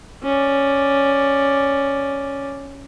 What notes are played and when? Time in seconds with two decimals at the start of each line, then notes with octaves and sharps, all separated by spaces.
0.23 C#4 D5